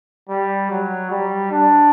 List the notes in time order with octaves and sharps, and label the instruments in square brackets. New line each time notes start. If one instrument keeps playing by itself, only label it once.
[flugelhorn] G3
F#3
G3
D4